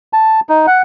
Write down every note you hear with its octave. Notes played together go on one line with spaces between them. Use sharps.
A5
D#4
F#5